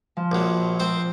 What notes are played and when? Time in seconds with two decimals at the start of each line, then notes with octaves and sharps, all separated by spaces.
0.17 F3
0.32 A#1 F#3
0.80 C4 C5